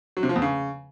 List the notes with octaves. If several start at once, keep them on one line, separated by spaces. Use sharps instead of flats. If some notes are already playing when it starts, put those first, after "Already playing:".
F#3
C3
F3
E2
C#3